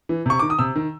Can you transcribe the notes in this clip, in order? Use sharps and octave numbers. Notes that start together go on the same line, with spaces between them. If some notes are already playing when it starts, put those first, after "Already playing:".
E3
C3 C#6
D#3 D6
D#6
C3 E6
D#3